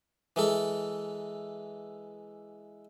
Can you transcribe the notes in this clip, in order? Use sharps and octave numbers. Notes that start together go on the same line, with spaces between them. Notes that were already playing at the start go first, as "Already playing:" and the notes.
E3 G#3 A4